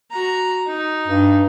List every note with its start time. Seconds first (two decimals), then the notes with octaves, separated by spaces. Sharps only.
0.11 F#4 A#5
0.67 D#4
1.08 G2